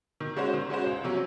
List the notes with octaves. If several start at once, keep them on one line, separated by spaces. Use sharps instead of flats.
D#3
G#3 C#4 F#4 C5
D#3
G#3 C#4 F#4 C5
C#2
C3 F#3 C#4